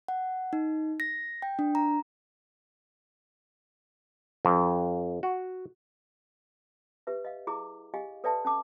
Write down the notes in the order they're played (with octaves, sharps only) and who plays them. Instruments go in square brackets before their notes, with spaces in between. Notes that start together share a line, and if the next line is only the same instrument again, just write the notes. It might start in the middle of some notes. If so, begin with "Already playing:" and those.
[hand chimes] F#5
D#4
A#6
G5
D4
A#5
[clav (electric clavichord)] F2
F#4
[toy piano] G4 B4 E5
D#5 F5
E4 G#4 A#5 D6
G4 D#5 F5 G#5
A4 B4 D5 E5 G5 A5
C#4 A5 D6